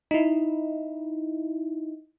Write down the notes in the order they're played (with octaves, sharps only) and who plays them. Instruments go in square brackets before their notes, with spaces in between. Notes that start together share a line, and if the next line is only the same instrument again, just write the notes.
[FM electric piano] D#4 E4